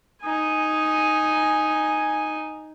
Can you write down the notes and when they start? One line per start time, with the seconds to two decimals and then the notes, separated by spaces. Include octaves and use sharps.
0.22 D#4 G#5